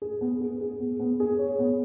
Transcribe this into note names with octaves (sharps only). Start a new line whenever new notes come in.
G#4
B3
G#4
G#4
B3
B3
G#4
C#5
B3